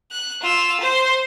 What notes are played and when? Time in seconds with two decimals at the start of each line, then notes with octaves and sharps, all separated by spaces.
0.11 F#6
0.41 F4 E6
0.80 C5 C6